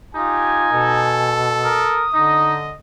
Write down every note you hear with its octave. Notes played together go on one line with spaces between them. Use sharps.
D#4 F4 G4 G#5
B2 A4
A#4 D#6
D3 D#4 D#5